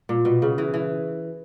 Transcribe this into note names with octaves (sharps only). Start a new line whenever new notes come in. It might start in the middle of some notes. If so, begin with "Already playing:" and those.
A#2
B2
C#3
E3
E3